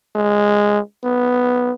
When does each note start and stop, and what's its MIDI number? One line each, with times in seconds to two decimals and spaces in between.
0.16 0.79 56
1.04 1.71 59